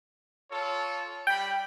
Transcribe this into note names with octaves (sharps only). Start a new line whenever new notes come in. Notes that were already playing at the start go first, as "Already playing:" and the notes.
F4 A4 C#5
G3 G5 B5